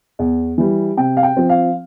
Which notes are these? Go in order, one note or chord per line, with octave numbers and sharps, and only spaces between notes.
E2
E3 G3
C3 G5
F5
G5
F3 C4
F5